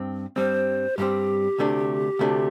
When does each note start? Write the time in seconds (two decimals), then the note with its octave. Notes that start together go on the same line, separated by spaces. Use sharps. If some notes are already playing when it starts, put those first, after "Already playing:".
Already playing: G2 C4
0.36 G2 G3 C4 C5
0.98 G2 G3 C4 G4
1.58 D2 C3 A3 D4
2.19 D2 C3 A3 D4